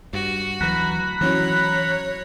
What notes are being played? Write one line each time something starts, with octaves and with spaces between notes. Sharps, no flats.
G2 F#4
D2 E3 F#3 A#5 B5 F#6
E3 F#3 C4 C#4 E4 F#4 C#5